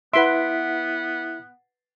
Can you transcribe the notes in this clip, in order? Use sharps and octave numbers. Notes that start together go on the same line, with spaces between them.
B3 E4 B4 E5 F#5 C6 B6 D7